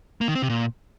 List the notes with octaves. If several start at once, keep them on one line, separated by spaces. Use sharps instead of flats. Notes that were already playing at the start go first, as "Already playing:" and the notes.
A#3
D#3
C4
C3
A#2